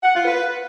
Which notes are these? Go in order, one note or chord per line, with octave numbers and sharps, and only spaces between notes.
F#5
F4
B4